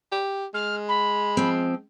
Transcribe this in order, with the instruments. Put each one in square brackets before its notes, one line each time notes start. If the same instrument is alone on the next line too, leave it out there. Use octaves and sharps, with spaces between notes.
[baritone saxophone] G4
[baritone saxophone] G#3 [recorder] F6
[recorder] B5
[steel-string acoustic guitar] F3 C4